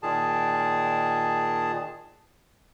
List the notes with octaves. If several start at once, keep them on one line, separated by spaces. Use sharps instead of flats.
A#2 D#3 G#4 A5